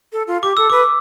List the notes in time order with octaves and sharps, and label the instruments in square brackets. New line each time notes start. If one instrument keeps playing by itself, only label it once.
[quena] A4
F4
[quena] G4 [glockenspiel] D6
[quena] A4 [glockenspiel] E6
[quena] B4 [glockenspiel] D6